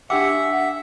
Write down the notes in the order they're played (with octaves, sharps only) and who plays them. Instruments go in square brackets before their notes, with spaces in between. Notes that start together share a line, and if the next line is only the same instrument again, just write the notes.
[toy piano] D4 G4 D6 [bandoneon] E5 [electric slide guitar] F#5 [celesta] G5 E6